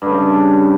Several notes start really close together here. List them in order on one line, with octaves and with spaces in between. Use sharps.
G2 A3 C#3